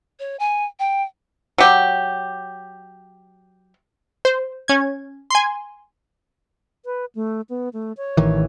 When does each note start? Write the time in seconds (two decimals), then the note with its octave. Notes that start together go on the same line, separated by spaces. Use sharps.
0.19 C#5
0.39 G#5
0.79 G5
1.58 F#3 G4
4.25 C5
4.68 C#4 G#6
5.30 G#5 C6
6.85 B4
7.15 A3
7.49 B3
7.73 A3
7.97 C#5
8.17 A1 D#3 E3